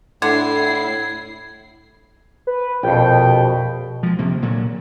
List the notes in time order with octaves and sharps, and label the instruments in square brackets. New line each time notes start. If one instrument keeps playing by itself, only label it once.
[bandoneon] A2 [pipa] D3 [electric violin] E4 C7 [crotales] G#6
[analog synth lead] B4
[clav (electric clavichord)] A#1 F2 [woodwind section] B2 [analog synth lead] G5
[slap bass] F3 G#3
D1 C3 F3 A#3
A#2 D3 F#3